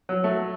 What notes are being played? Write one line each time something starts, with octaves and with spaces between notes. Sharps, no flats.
F#3
A3